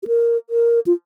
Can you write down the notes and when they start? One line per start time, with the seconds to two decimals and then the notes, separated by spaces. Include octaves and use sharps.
0.03 G4
0.07 A#4
0.50 A#4
0.86 F4